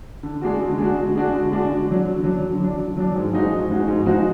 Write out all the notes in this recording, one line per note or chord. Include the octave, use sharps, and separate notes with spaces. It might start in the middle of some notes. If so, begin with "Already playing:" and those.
D3
G#3 D4 F#4
D3
G#3 D4 F#4
D3
G#3 D4 F#4
D3
G#3 D4 F#4
D3
F#3 D4
D3
F#3 D4
D3
F#3 D4
D3
F#3 D4
G#2
F3 G#3 D#4 F#4
G#2
F3 G#3 D#4 F#4
G#2
F3 G#3 D#4 F#4